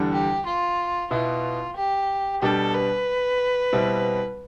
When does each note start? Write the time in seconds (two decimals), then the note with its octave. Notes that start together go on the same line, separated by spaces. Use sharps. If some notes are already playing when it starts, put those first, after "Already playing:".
Already playing: E2 D3 G3 D4 A4
0.12 G4
0.46 F4
1.11 B2 B3 E4 F4
1.76 G4
2.42 B2 G3 D4 G4 A4
2.74 B4
3.72 B2 G3 C4 E4